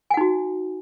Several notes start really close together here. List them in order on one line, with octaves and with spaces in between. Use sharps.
G#5 F#5 D#4 F#4